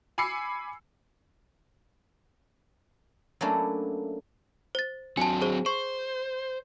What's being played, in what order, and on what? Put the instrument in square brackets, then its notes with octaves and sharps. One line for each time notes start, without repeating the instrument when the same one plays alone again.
[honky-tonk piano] G#5 B5 D6 E6 C7 C#7
[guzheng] F#3 A3 A#3 C#4 D4 E4
[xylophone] C5 A6
[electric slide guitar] F#3 C4 [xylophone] G#5 A5
[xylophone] G#4 C5
[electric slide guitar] C5 [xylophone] C#6